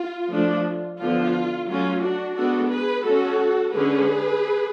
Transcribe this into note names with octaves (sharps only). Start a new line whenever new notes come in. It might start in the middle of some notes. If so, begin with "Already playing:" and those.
Already playing: F4
F3 A3 D4
D3 F3 B3 F4
F#3 A3 C#4 F4
D4 F#4
G#3 B3 D4 F#4 A4
G#4 B4
G#3 C#4 F#4 A4
D3 G#3 C#4 G#4 B4